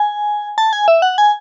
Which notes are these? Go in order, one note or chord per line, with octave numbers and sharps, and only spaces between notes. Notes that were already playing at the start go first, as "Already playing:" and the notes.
Already playing: G#5
A5
G#5
E5
F#5
G#5